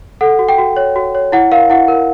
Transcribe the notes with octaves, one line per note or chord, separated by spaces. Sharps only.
A4 F#5
F#4
G5
F#4
C#5
F#4
C#5
E4 F#5
A#4 F5
E4 F#5
A#4